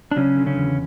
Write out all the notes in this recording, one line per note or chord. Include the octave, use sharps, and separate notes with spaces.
D4
C#3 F#3 C#4
D3
C#3 C#4
E2